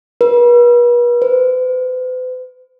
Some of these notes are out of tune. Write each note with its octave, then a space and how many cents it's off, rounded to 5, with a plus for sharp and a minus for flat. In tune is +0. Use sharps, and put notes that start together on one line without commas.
B4 -40
B4 +45